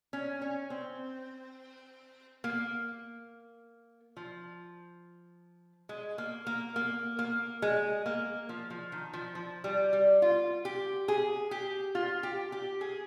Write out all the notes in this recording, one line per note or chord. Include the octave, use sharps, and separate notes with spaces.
C#4
C#4
C4
A#3
F3
G#3
A#3
A#3
A#3
A#3
G#3
A#3
F3
F3
D#3
F3
F3
G3
G3
F4
G4
G#4
G4
F4
G4
G4
G#4